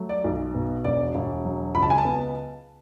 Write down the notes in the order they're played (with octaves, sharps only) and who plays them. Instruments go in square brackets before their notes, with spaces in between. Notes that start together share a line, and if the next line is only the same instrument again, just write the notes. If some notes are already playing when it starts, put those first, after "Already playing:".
Already playing: [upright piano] F#3 A3
D5
B1
B2
E1 D5
E1
F#3
C#2 B5
A5
G#5
A5
B3